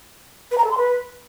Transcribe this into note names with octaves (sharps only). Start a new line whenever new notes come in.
B4
A#5
A4
C6
B4